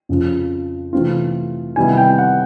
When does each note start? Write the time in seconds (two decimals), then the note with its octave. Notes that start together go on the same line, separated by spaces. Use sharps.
0.09 F2 C#3 F3
0.93 C3 E3 A3 C4 F4
1.76 C3 D#3 G3 B3 E4 G#5
1.97 G5
2.18 F#5